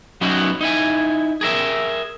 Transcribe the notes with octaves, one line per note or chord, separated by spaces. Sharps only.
F#3 B3 C#4 D#4 E4 F#4
D#4 E4 G#5
G#4 A#4 E5